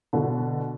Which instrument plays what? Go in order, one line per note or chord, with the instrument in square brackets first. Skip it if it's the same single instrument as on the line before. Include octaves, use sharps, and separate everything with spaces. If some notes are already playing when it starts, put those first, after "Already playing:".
[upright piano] B2 D3